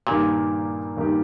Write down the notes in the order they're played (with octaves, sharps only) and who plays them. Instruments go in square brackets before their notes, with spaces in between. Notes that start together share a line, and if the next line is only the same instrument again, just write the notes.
[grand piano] G2 D#3 A#3 D#4 G4 [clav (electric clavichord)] A#2
[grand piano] G2 D#3 A#3 D#4 G4